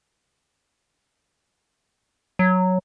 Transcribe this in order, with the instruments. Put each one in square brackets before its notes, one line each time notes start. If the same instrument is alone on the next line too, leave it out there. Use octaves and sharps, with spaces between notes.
[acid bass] F#3